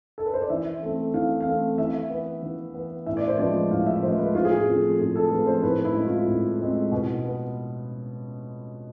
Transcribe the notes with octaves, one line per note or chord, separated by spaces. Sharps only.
A4
B4
C5
D5
E3 E5
A3 C4
E3 F5
F5
A3 C4
E3 E5
B3
E3
B3
A2 E5
D5
C5
F3 G#3 B3 D5
A2 F5
E5
F3 G#3 B3 C5
B4
A2 F4
G#4
F4
F3 A3 C4
A2 G#4
A4
F3 A3 C4 B4
C5
A2 B4
E4
G#3 C4
F4
A2
G#3 C4
B2
B3